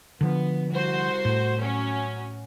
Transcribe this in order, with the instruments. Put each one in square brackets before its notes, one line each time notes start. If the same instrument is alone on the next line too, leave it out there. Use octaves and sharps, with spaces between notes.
[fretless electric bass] D3 F3 [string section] B3
[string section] C2 F#4 C5
[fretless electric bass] A2
[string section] F#3 C#4